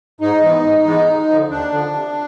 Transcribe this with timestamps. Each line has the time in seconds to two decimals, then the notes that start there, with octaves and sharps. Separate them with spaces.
0.21 G#2 D#4
0.42 E3 G#3 B3
0.64 G#2
0.85 E3 G#3 B3
1.07 D#2
1.28 D3 F3
1.50 D#2 D4
1.71 D3 F3
1.93 C3